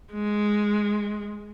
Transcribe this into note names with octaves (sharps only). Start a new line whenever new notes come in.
G#3